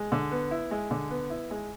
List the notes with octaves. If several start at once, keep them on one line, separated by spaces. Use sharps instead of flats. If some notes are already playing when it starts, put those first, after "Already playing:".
Already playing: G#3
D3
B3
E4
G#3
D3
B3
E4
G#3